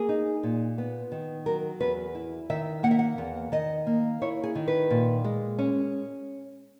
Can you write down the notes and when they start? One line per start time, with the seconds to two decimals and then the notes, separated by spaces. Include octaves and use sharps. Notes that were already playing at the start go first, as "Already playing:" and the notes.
Already playing: A#3 G#4
0.09 D#4
0.43 A#2
0.78 B3
1.12 D#3
1.46 F#3 A#4
1.80 E2 B4
2.15 E4
2.50 D#3 E5
2.83 A#3 F#5
2.91 E5
2.99 F#5
3.18 E2
3.52 D#3 D#5
3.87 A#3
4.22 E4 C#5
4.44 G#4
4.55 D#3
4.68 B4
4.90 A#2
5.24 G#3
5.58 C#4